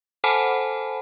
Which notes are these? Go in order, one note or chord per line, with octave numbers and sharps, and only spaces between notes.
A4 C5 F#5 G#5 A5 B5